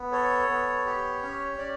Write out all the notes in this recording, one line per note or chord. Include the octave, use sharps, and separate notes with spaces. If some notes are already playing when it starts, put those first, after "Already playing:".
Already playing: B3
A4 C#5
B3
G4
C#4
C#4 D5